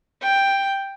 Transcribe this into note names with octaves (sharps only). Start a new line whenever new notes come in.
G5